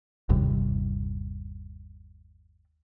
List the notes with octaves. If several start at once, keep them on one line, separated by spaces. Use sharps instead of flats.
G1 D#2 C3 G3